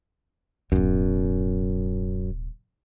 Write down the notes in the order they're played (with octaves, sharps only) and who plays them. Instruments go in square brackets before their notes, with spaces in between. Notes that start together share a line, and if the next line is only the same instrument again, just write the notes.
[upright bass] D1 B2 [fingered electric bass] F#2